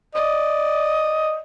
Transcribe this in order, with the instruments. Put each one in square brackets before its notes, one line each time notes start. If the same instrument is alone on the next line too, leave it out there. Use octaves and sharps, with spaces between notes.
[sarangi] D5 [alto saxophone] D#5